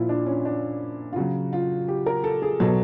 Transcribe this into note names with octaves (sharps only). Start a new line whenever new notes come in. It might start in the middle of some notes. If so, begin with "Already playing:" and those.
Already playing: A#2 F3 E4 F4
D4
C#4
D4
F4
C#3 F#3 F#4
F4
G4
A#4
A4
G#4
B2 F#3 A4